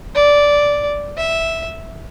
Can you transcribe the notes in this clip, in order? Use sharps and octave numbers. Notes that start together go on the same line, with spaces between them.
D5
E5